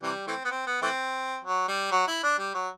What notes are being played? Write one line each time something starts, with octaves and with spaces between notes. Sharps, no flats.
C3 E3 G3
E3 A3 C4
B3
C4
B3
E3 A3 C4
F#3
G3
F#3
E4
D4
G3
F#3